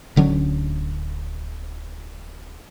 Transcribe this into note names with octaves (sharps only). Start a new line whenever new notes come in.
D1 D3 F#3 C#4